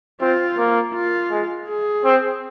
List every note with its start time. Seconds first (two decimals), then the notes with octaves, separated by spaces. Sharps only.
0.21 C4 F4
0.58 A#3
0.95 F4
1.31 G#3
1.68 G#4
2.05 C4